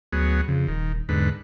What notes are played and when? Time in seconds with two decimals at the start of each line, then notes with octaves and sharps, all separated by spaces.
0.12 D2 F#3 B3 G#4
0.48 F2 C#3
0.68 D#1 D#3
1.09 E2 G#2 D3 B4